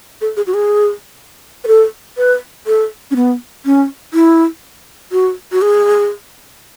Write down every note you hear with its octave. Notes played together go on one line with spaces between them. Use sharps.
A4
G#4
F#4
G#4
B4
A4
B4
A4
C#4
B3
C#4
E4
F#4
F#4
G#4